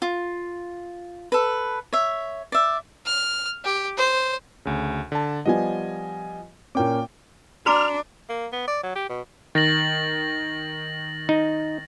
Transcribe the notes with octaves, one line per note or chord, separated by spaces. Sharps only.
F4
A4 B4
C#5 E5
D5 E5
F6
G4
C5
D2 C#3
D3 A5
F3 G3 B3 D#5 G#5
A#2 A#3 C#4 G5 D6
D4 F#4 A#5 D6 F6
A#3
B3
D5
F#3
G4
B2
D#3 A6 A#6 F#7
D#4